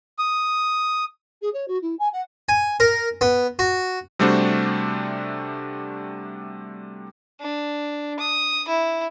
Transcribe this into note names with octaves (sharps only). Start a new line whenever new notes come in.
D#6
G#4
C#5
F#4
E4
G#5
F#5
G#5
A#4
B3
F#4
C3 G3 A3 D4 F#4 C5
D4
D#6
E4